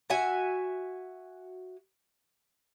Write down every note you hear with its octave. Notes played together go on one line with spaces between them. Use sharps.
F#4 E5 G#5